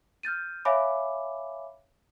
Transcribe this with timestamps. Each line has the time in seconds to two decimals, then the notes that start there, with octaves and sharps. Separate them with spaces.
0.23 F6 G6 A6 D#7
0.65 C#5 E5 F5 G#5 B5 D6